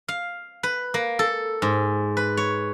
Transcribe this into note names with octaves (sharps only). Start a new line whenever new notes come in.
F5
B4
A#3
A4
G#2
B4
C#5